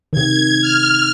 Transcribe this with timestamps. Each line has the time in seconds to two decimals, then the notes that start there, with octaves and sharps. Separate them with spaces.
0.13 C3 D#3 G#6
0.61 F6